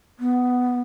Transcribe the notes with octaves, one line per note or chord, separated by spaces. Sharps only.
B3